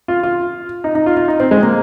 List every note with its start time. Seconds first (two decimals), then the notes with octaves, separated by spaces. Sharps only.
0.08 F4
0.23 F4
0.84 D#4
0.95 D#4
1.06 F4
1.17 F4
1.28 D#4
1.40 C4
1.51 G#3
1.63 A#3